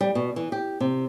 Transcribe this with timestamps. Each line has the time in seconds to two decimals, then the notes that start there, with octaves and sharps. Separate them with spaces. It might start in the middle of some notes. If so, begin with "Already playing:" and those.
0.01 G3
0.15 B2
0.36 E3
0.52 G4
0.80 C3